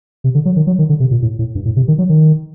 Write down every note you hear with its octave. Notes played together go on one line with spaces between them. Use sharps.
C3
D3
F#3
D#3
F#3
D#3
D3
C3
A#2
A2
A2
G2
A2
C3
D#3
F#3
D#3